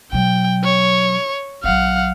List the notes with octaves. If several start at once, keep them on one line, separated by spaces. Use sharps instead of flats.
B2 F#3 G5
C#5
A#1 F#3 F5 F#5